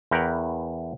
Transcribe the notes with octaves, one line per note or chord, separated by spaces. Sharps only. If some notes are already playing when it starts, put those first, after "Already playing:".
E2 E4 A#4 F#5 G5